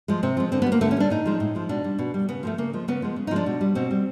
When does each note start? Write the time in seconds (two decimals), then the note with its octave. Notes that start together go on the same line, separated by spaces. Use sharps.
0.08 F3 G#3
0.23 C3 C4
0.37 F3 G#3
0.52 D3 C4
0.62 B3
0.66 G3
0.72 A#3
0.81 D3 A3
0.91 C#4
0.97 G3 D4
1.10 A2 D#4
1.26 F3 G#3
1.40 A2
1.55 F3 G#3
1.69 B2 D4
1.84 G3
1.99 B2
2.14 G3
2.29 C#3 B3
2.43 F3 G#3 A3
2.58 C#3 A#3
2.73 F3 G#3
2.88 C#3 B3
3.02 F3 G#3
3.16 C#3
3.27 D#4
3.31 F3 G#3 D4
3.46 B2
3.61 G3
3.75 B2 C4
3.91 G3